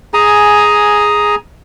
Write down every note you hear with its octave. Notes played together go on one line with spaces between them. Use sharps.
G#4 G#5 A#5